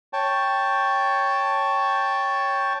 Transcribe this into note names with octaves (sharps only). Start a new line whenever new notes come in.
C#5 G5 A5